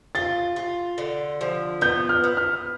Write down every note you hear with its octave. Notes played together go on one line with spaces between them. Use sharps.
F4 A6
F4
D3
F3
B3 G6
F6
B3
F6